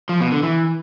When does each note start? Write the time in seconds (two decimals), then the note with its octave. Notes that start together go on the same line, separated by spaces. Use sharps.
0.09 F3
0.21 B2
0.32 D3
0.43 E3